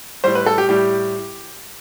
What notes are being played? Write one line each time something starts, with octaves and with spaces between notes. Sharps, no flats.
A2 G3 C5
B4
A4
G4
A2 G3 G4